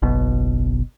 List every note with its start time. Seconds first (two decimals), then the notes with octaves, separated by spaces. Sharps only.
0.02 F#1 B1 B2